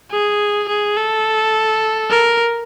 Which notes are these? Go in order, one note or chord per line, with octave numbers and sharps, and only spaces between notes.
G#4
G#4
A4
A#4